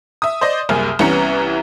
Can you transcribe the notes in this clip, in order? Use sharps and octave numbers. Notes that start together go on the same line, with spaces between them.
E5 D#6
C5 D5 D#5
F#1 C2 C3 A#3 G#5 F6
C2 E3 B3 C#4 A#5 C#7